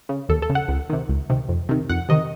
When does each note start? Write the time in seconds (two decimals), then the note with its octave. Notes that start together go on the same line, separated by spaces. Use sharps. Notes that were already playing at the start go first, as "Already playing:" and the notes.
0.09 C#3
0.29 D#2 A4
0.42 A4
0.50 C#3
0.55 F#5
0.68 C#2
0.90 C3 D#3
1.09 C#2
1.30 C3 D#3
1.49 F2
1.69 C3 D#3
1.89 F2 F#5
2.09 C3 D#3 D#5